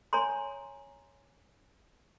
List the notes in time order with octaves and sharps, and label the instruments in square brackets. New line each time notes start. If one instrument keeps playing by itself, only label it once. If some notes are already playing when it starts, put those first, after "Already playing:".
[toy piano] C#5 G#5 A#5 C6